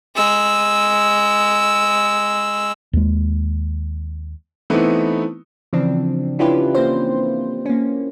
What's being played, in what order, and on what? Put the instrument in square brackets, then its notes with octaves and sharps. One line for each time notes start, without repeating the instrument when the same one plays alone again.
[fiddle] G#3 E6
[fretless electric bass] D#2 G#3
[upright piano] E3 A3 B3 C4 D#4 E4
[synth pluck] C#3 E3 F3 C4 D4
C#4 D4 E4 F4 G4 B4
A#3 C4 C5
A#3 C#4